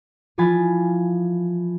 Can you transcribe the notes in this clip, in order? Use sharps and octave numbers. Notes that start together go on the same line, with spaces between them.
E3 F3 F4 G#5 B5 A6